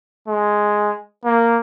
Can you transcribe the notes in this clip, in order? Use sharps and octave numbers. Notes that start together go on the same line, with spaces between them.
G#3
A#3